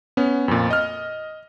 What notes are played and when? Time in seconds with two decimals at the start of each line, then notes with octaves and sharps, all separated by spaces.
0.17 B3 C#4
0.48 F2 A#2
0.71 D#5 F6